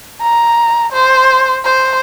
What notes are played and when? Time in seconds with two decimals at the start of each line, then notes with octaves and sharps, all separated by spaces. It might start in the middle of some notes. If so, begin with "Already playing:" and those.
0.22 A#5
0.93 C5
1.65 C5